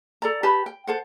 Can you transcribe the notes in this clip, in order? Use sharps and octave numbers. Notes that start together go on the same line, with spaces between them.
A4 D5 A#5
G4 B4 A5 B5
G5
A4 C5 F#5